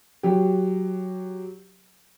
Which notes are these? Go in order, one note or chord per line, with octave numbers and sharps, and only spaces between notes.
F#3 G4